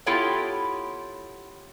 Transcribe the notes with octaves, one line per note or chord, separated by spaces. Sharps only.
B3 E4 F4 G4 A4 C#5